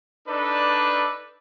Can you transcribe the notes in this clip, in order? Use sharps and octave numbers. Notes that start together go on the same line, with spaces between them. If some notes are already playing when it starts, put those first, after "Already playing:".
D4 D#4 A4 B4 D5